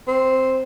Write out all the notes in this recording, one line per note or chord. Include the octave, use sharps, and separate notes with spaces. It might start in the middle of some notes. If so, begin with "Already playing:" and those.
C4